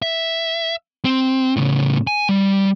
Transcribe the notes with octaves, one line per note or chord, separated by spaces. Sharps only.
E5
C4
A2 C#3
G#5
G3